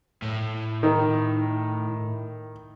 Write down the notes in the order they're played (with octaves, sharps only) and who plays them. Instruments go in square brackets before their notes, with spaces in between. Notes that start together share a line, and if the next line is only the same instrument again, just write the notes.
[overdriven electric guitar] A2
[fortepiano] D#3